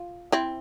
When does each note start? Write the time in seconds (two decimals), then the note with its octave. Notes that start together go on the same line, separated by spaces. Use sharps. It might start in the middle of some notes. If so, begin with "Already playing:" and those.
Already playing: F4
0.32 C4 E4